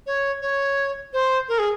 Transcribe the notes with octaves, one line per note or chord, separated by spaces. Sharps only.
C#5
C#5
C5
A#4
G#4